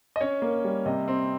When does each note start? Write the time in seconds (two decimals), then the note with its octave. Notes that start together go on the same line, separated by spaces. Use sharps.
0.16 D#5
0.21 C#4 C#5
0.42 A#3
0.64 G3
0.86 C3 D#5
1.08 C4